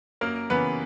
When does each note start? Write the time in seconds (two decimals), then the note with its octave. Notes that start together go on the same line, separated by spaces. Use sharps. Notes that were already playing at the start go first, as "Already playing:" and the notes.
0.21 F#2 A#3 A#4
0.50 C#3 E3 B3 B4